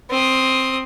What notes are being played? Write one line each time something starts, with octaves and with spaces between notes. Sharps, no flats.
C4 D#6